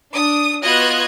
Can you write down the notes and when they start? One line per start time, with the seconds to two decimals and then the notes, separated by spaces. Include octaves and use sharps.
0.11 D4 D#6
0.62 B3 F4 F#4 D#5 F#6 G#6